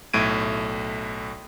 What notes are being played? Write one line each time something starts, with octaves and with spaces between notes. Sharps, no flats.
B1 A2 A3 G#6 D7 D#7